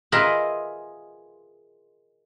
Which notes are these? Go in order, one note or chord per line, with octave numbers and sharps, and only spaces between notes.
F4 G#4 A#4 B4 D#5 E5